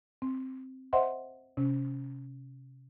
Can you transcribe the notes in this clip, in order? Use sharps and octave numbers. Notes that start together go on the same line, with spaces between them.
C4
C5 D#5 E5 F#5 C6
C3 C#4